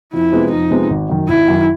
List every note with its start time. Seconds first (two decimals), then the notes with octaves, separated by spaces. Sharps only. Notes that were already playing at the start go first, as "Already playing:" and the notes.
0.13 F2 E4
0.32 C3 F3 G#3 B3
0.51 F2 D#4
0.70 C3 F3 G#3 B3
0.90 G#1
1.09 F#2 D#3
1.29 G#1 E4
1.48 F#2 D#3